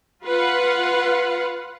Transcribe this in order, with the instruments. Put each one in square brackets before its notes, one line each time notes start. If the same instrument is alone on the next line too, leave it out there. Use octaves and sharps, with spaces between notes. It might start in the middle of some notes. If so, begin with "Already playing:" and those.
[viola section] F4 B4 F5 F#5